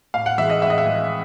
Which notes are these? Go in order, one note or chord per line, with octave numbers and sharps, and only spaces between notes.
A2 F5
F#5
E3 G#3 E5
D#5
A2 E5
D#5
E5
E3 G#3